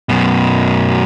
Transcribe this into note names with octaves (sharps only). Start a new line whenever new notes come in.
F#2 B2